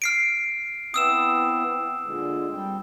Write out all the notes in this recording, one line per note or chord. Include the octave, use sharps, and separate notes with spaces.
F6 C7 D7
B3 C4 E4 D#6 E6 E7
A#2 D3 G#3
G3 C4 G5